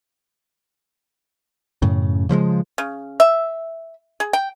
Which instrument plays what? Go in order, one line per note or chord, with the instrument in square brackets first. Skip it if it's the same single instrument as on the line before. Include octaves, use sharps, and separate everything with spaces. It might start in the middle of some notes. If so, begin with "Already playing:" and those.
[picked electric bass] F#2 A2 C#3
C#3 F3 G3 G#3
[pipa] C#3
E5
G#4
G5